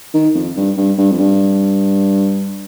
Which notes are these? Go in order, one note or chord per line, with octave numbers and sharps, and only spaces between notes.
D#3
F2
G2
G2
G2
F2
G2